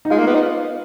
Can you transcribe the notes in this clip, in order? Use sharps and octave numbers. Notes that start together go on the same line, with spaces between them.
D#4
G#3 F4
A#3
B3
D#4